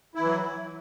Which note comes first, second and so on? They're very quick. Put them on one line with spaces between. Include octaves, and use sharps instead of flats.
E4 E3 F#3